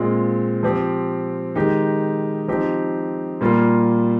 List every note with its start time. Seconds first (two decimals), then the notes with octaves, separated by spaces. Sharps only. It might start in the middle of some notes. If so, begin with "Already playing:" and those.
Already playing: A#2 G#3 C4 F4
0.63 F3 C4 G4
1.55 D#3 G#3 D#4 G4
2.48 F3 C4 D#4 G4
3.41 A#2 G3 A#3 F4